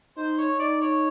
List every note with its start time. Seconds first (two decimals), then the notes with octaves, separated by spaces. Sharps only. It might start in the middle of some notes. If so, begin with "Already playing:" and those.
0.17 D#4 C5
0.38 C#5
0.59 D#4 D5
0.81 C#5